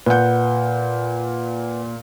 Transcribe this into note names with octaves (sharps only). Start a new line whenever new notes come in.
A#2 B4 F#5 G6